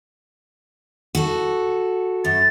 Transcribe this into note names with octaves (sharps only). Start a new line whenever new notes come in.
F#4 A4
F#2 A6